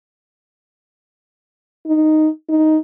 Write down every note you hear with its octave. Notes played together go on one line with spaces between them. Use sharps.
D#4
D#4